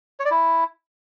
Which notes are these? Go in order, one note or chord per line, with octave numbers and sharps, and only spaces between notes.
C#5
D5
E4